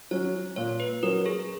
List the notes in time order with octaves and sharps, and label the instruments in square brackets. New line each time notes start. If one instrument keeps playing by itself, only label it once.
[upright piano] F#3 C#4 [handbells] C#5
[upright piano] A#2 [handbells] C#5
[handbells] B4
[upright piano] F#3 C#4 [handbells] A#4
[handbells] G#4